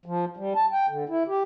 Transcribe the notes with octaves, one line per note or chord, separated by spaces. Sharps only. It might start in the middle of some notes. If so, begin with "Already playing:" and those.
F3
G3
A5
G5
D3
E4
G4